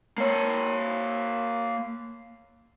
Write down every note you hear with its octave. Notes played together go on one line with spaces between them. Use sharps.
A#3 C#5